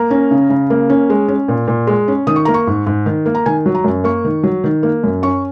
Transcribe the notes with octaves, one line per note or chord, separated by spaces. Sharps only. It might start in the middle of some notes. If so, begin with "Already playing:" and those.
Already playing: A#3 A#5
C#4
C#3
C#3
A#3
C#4
G#3
C#4
A#2
A#2
G#3
C#4
D#3 D#6
C#6
A#3 A#5
C#6
G#2
G#2
D#3
A#3
A#5
D#3 G#5
F#3
A#5
F#2
A#3 C#6
D#3
F#3
D#3
A#3
F#2
C#4 C#6